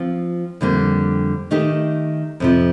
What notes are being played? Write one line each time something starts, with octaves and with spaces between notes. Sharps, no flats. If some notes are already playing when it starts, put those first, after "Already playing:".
Already playing: F3 C4 F4
F2 D3 G3 A#3
D#3 A3 D#4 G4
F2 C3 F3